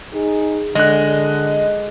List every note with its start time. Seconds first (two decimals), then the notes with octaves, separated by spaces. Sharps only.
0.13 D#4 G#4
0.75 D3 G#3 D#5 F#6